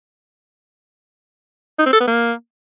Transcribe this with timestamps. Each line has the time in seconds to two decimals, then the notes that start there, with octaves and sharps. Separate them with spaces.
1.79 D#4
1.86 C4
1.93 A4
2.00 B3
2.07 A#3